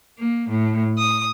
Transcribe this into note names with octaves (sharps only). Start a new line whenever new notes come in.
A#3
A2
D#6